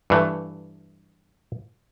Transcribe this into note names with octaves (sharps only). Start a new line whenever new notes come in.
G2 E3 A3